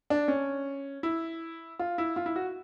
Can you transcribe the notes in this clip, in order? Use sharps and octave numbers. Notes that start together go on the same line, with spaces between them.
D4
C#4
E4
F4
E4
F4
E4
F#4